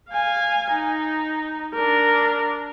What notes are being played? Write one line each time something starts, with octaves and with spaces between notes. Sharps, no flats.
F5 G#5
D#4
D4 A#4